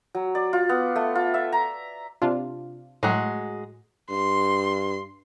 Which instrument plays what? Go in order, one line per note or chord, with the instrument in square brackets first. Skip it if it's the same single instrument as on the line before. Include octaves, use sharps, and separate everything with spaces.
[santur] F#3
D5
F4
B3
A3
F4
E5
A#5
[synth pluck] C3 D4 F4
[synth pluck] A2 [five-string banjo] F#3 G#3
[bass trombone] G2 [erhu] C6